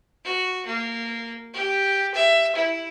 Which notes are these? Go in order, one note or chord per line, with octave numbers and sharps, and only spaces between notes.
F#4
A#3
G4
E5
E4